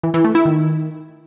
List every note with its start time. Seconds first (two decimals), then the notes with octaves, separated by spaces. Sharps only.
0.03 E3
0.14 E3
0.24 A3
0.35 E4
0.45 D#3